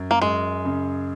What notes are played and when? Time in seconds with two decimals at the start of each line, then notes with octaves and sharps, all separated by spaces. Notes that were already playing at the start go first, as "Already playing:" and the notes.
Already playing: F#2
0.11 A#3
0.22 F#2 G#3
0.65 C#3